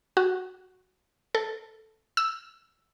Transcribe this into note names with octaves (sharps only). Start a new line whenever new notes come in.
F#4
A4
E6